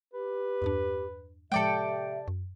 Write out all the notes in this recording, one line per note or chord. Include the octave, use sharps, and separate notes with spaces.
G4 B4
E2 G2 D4
A2 C3 F3 G#3 A4 D5 E5 G5
F#2